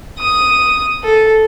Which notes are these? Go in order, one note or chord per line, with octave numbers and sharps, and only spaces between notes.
D#6
A4